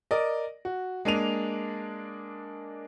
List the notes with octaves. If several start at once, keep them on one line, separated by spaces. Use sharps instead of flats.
A#4 D5 D#5
F#4
G#3 A#3 D4 D#7 F7